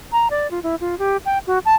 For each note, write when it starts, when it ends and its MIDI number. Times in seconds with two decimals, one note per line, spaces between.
0.12 0.28 82
0.30 0.50 74
0.51 0.60 65
0.63 0.76 64
0.81 0.97 65
0.99 1.17 67
1.26 1.38 79
1.47 1.59 66
1.65 1.75 81